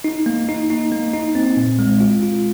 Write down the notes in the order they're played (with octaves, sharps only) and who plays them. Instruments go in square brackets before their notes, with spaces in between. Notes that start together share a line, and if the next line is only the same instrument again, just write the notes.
[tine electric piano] D#4
A#3
D#4
D#4
A#3
D#4
C4
A#2
G#3
F4
F4